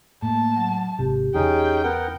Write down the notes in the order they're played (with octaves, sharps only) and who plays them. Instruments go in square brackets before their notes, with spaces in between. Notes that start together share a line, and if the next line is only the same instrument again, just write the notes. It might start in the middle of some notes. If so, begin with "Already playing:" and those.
[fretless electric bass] A2 [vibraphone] A#3 [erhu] A5
[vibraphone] F#3
[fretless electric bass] G#1 C3 [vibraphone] G4
[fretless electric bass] E2 C#3 [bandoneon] C#4 D#4 G#4 [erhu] G5
[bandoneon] B3 A#4 F#5